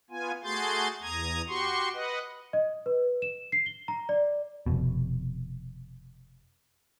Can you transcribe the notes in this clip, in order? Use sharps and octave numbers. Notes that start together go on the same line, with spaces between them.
B3 F4 G#5
A3 F#4 G#4 C6 G6 A6
E2 A#5 D#6 G#6
F#4 G4 C6 C#6
B4 D#5 F#5
D#5
B4
E7
C7
G7
A#5
D5
F1 B2